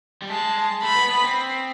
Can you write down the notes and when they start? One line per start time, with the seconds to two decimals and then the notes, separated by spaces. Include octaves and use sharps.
0.22 G3
0.30 G#3 A5
0.83 A3 B5
0.96 B3
1.10 B3
1.24 C4